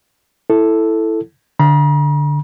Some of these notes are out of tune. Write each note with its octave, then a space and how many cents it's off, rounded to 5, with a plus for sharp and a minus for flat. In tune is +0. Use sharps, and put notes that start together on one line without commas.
E4 +0 A4 +0
D3 +0 A#5 +45